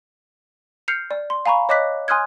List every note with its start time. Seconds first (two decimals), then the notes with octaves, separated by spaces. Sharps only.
0.88 F6 G6 C7 C#7 F7
1.11 D5
1.30 C6
1.46 F5 G#5 A#5 B5 C#6
1.69 C#5 D#5 D6 F#6 B6
2.08 G#5 C6 D#6 F6 F#6 G#6